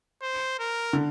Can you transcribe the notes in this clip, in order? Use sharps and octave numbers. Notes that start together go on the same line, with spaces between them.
C5
A#4
D3